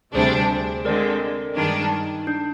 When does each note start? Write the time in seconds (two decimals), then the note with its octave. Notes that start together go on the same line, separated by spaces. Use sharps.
0.14 D2 C3 G3 D4 G#4 C5
0.85 D3 G#3 C4 A#4 D5
1.57 G2 D#3 G#3 D4 D#4
2.27 D4